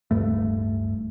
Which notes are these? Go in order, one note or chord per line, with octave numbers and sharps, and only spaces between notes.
D1 G2 A3